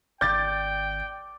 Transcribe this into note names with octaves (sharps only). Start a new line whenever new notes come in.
G#1 D5 G5 G6 A6